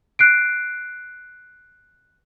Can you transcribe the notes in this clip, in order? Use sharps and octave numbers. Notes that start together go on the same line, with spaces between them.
F#6 C7 D7